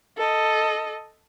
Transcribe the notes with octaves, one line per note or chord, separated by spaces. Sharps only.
A4 D#5